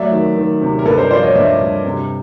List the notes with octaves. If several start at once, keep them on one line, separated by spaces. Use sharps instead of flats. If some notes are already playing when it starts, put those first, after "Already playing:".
Already playing: F#3 A3 D5 E5
D#3
D#3
C3
A#4
G2 A4 B4
A#4 C5
F3 C5 D5
C#5 D#5
G2 D5 E5
G2
C3